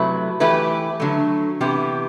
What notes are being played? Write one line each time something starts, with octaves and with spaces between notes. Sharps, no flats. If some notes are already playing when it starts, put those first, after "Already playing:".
Already playing: C3 F#3 A3 E4 B4
E3 A3 E4 G4 B4
D3 F#3 A3
C3 E3 B3 E4 G4